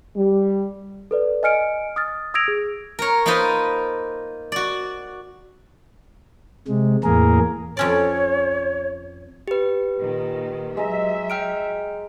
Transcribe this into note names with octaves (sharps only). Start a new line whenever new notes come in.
G3
A4 B4 D5
D#5 G#5 F6 C#7 D7
D#6 F6 A6
D#6 E6 G#6 A#6 D7 F7
G#4
A#4 C#5
A#3 D#4 F4 B4 C5 D#5
F#4 D5
C3 G#3
E2 A2 A#3 G#4 A#4
F2 C#4 C#5 D5
G4 B4
A#2 D#3
F#3 G#3 E5 A#5
G5 F6 D7